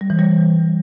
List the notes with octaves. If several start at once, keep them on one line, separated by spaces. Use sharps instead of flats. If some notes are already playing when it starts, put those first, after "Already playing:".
G3
E3
G3